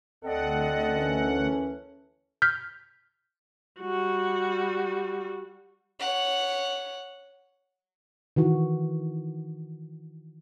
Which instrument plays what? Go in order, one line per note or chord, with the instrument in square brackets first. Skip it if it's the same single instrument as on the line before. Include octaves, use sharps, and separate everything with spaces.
[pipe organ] D2 F#5 [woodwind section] C4 D5 D#5 [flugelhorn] A4
[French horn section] E3 A#3 C#4
[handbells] F6 G6 B6
[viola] G3 F#4
[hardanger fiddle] C#5 F#5
[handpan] D#3 E3 F#4